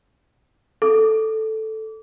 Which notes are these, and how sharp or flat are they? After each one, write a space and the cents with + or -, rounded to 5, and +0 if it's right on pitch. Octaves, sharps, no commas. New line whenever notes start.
A4 +0 D6 -25